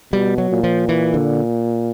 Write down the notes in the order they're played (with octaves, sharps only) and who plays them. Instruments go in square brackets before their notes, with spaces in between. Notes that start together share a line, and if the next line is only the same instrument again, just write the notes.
[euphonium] B2 [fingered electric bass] G3
[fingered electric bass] F#3
[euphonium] A#2
[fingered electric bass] F3
E3
D3